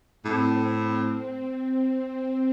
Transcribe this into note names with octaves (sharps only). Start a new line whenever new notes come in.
A2 C4
C4
C4